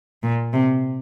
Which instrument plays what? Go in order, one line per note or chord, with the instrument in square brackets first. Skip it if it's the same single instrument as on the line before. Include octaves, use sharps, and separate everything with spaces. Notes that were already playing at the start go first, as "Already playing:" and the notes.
[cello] A#2
C3